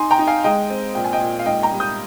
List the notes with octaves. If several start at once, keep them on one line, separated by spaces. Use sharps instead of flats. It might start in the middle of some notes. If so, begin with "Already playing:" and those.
Already playing: D#4 G#5 C6
G5 A#5
D#4
F5 G#5
G#3 D#5 G5
C4
A#2 G5
G#5
D#5 G5
A#2
F5
G#2 D#5 G5
G5 A#5
G3
D#6 G6